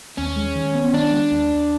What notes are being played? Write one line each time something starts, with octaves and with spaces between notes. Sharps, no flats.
D#2 C#4
G#3
D#3
B3
D#3 D4
G#3
D#2
D#2